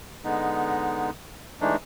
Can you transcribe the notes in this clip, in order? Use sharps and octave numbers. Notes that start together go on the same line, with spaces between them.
D3 G#3 B3 D#4
E3 G#3 A3 D4 D#4